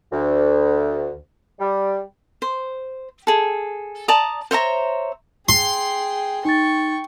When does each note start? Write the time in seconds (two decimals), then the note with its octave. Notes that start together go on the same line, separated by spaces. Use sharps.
0.12 D2
1.59 G3
2.42 C5
3.27 G#4 A4
4.08 D5 A5 A#5 D#6
4.51 C5 C#5 E5 A#5
5.49 G#4 G5 C6
6.45 D#4 G5 C#6 A6